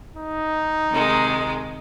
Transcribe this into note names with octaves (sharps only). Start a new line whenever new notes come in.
D#4
C3 D#3 G#3